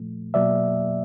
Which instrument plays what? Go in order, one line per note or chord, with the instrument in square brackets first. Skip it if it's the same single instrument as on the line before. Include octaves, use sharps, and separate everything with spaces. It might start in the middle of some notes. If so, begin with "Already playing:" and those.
Already playing: [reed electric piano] A#2 F3 A3
B2 F#3 A#3 D5 E5